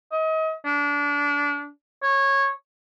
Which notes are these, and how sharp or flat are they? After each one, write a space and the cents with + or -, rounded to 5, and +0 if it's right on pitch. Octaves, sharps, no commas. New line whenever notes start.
D#5 +35
D4 -25
C#5 -15